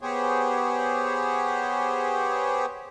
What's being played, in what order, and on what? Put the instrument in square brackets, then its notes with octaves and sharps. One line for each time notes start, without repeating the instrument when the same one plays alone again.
[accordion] B3 G4 G#4 C5 C#5